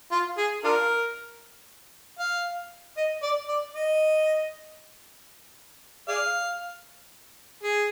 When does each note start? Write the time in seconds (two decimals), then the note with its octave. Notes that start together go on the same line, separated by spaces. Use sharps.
0.11 F4
0.38 G#4
0.64 D4 F4 A#4
2.19 F5
2.97 D#5
3.23 D5
3.48 D5
3.74 D#5
6.08 G#4 D5 F5
7.63 G#4